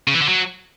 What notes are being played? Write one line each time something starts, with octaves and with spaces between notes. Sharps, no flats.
C#3
E3
D3
F#3